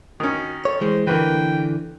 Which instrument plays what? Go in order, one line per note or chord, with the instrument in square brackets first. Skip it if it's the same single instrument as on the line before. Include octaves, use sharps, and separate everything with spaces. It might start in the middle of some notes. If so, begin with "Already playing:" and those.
[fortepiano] D#3 C#4 [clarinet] F#4
[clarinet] A4 [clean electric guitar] C#5
[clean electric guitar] E3 G#3 [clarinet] C5
[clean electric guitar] D3 E3 [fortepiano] A#3 F#4 B4 [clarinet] G5